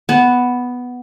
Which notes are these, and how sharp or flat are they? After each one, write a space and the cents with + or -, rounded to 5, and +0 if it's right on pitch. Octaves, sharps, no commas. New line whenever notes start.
B3 +0 A5 -30